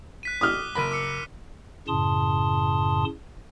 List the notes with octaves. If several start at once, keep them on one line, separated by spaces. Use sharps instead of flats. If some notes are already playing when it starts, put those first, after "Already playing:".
F#6 B6 D#7
D6 D#6 F6 G7
F#1 A#4 B5 B6 D#7
D6 E6 C#7
F#2 A2 C#3 A5 C6 D#6